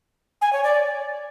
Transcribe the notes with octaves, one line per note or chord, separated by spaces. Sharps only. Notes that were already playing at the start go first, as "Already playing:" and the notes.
G#5
C#5
D5